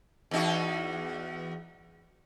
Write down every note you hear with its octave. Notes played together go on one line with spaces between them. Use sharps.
E2 D#4 F#4